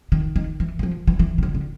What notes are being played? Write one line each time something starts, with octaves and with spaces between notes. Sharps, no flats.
D#3
D#3
E3
E3
F3
E3
E3
C#3
D3
D3